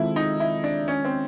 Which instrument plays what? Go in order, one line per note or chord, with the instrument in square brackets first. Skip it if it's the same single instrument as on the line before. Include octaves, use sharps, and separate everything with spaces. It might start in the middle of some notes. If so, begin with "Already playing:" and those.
Already playing: [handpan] D#3 G#3 C4 F4 A4 [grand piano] E4
[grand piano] D#4
E4
D4
C#4
C4